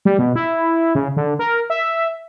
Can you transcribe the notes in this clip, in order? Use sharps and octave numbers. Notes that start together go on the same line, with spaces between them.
G3
B2
E4
C#3
D3
A#4
E5